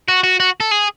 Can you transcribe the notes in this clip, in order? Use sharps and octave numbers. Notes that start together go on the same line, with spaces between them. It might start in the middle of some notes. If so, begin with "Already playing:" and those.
F#4
F#4
F#4
A4
G#4